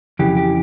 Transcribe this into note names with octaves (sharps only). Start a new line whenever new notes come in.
F2 C#3 E3 G4
G4